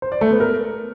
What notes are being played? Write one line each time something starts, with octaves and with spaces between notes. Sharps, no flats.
C5
D5
A3
B3
A#4